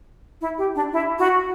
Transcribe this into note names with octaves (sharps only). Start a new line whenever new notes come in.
E4
G4
D4
E4
F#4